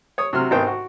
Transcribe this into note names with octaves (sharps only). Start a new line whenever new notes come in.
C#5 D#6
C3 F#3 C6 F6
G#1 D#3 B3 C5 G5
F#4